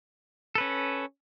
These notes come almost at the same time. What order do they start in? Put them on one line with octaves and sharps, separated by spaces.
A4 B4 C#4